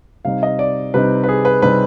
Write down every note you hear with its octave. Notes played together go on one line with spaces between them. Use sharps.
C3 G3 C4 D#4 F5
D#5
D5
C3 G3 C4 D#4 B4
B4
G#4
B4
C3 G3 C4 D#4 B4